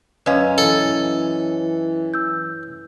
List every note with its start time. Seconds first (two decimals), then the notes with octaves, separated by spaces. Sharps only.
0.26 F#2 C#4 B4 D#5 F5
0.58 E3 A4
2.14 E6 G6